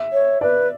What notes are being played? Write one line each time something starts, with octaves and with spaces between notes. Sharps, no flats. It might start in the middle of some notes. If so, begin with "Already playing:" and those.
Already playing: E5
C#5
B4 D5